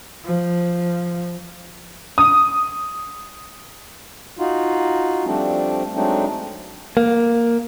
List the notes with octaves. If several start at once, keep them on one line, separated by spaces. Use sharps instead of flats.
F3
D#6
D#4 F4 F#4
F3 G3 A3 C4 D4
F#3 G#3 A3 C4 D4 D#4
A#3